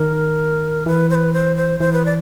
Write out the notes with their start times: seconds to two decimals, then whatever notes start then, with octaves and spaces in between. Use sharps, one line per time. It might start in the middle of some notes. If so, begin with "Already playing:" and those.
Already playing: D#3 A#4
0.86 E3 B4
1.10 C5
1.15 B4
1.33 C5
1.56 C5
1.80 E3 C5
1.93 B4
2.05 D5